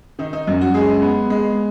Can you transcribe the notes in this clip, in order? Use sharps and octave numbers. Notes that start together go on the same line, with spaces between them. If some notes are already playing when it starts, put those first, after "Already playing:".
D#3 D#4
D#4
F#2
F#4
G#3 G#4
B3
G#3